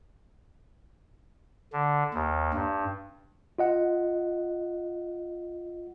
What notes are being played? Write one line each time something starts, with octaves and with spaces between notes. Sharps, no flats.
D3
D#2
G2
F4 D#5 F#5